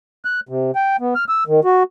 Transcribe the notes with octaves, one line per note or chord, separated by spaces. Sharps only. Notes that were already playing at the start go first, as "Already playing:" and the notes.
F#6
C3
G5
B3
F6
E6
D#3
F#4